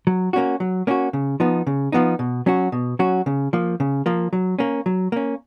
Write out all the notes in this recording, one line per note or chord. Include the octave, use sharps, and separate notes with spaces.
F#3
A#3 C#4 F#4
F#3
A#3 C#4 F#4
C#3
F3 B3 D#4
C#3
F3 B3 D#4
B2
F#3 C#4 F#4
B2
F#3 C#4 F#4
C#3
F3 A#3
C#3
F3 A#3
F#3
A#3 C#4
F#3
A#3 C#4